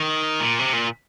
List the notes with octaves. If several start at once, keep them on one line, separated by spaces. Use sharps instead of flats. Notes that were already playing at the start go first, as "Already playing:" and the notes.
Already playing: D#3
A#2
C3
A#2